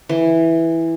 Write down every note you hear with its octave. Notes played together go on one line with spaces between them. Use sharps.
E3